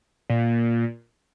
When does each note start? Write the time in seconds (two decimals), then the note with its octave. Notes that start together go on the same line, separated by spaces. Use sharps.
0.30 A#2